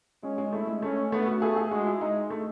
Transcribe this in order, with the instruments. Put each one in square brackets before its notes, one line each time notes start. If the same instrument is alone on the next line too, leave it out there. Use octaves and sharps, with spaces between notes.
[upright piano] G#3 [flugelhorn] C#4
[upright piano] G#3
[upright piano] A3 [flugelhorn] E4
[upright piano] G#3
[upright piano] A3 [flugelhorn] C#4
[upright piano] A3 [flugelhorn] B3
[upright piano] F#4
[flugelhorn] A3 [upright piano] G#4
[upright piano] G#4
[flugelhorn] G#3 [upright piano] F#4
[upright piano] E4
[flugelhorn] G#3 [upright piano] D#4
[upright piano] A3